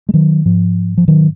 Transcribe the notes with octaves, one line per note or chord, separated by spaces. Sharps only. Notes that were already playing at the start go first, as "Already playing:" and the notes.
G#3
D#3 F#3
G#2 F3
F3
D#3 F#3